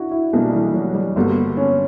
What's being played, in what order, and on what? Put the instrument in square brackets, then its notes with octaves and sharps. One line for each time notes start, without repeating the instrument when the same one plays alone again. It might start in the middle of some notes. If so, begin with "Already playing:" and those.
Already playing: [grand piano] D4 E4 F#4
E4
[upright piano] B1 B2 A#3 D4 [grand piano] G3
[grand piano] E3
F#3
G3
[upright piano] G1 G2 D3 F#3 A#3 [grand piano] B3
[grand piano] C#4